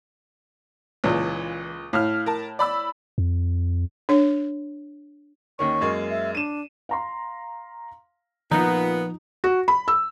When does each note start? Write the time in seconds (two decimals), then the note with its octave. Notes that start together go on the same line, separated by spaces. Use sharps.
1.04 C#2 A#2 E3
1.93 A2 F5 F6
2.26 A#4 A5
2.59 D5 B5 E6
3.18 F2
4.09 D4 C#5
5.59 D#2 D#3 C#4 C#6
5.81 F#2 G#3 A#3
6.10 E5
6.35 D4 D#7 E7
6.89 F5 A#5 C6
8.51 A#2 F3 B3 D#4 F4
9.44 F#4
9.68 B5
9.88 E6